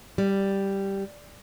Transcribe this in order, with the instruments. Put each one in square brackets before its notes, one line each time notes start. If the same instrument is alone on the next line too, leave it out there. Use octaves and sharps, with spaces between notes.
[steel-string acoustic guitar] G3